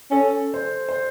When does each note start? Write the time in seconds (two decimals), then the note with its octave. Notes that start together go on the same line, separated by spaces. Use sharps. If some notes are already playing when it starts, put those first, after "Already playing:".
0.11 C#4 A4
0.54 C5
0.89 C5